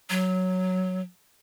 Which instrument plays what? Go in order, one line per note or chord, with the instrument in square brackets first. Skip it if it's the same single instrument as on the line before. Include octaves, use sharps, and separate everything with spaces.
[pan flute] F#3